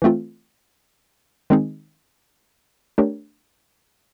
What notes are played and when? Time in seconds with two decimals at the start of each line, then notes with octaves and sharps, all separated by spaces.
0.02 E3 A3 C4 F4
1.50 D#3 G#3 C4 D#4 G#4
2.98 A3 D4 G4 A#4 C#5